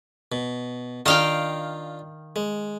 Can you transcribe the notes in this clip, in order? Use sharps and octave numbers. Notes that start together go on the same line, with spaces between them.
B2
D#3 D4 F4 F5 G5 A#5
G#3